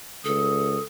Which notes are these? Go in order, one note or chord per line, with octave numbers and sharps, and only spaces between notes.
C#2 A4 D#6